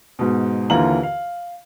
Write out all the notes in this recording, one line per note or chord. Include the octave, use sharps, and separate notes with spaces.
G#2 B2
D#2 D3 E3 F4 A#5 F#7
F5